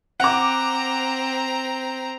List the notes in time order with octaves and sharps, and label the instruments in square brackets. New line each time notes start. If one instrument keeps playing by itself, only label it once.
[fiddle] C4 A#5 [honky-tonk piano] F#5 D6